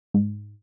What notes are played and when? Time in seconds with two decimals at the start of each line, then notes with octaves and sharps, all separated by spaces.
0.14 G#2